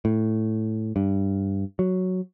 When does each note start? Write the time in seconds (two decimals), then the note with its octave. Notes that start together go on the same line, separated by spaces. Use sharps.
0.05 A2
0.96 G2
1.79 F#3